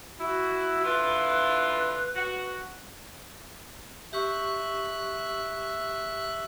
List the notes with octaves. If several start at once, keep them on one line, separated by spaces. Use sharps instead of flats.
E4 F#4
D3 E4 F4 B4
F#4
G4 E5 C#6 F#6